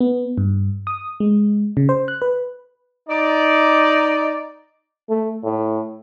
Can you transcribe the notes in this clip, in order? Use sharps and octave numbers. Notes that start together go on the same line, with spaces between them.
B3
G2
D#6
G#3
C#3
C5
F#6
B4
D#4 D5
A3
A2